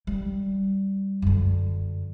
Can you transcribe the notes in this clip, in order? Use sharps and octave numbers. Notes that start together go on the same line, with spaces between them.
G3
F#2 D3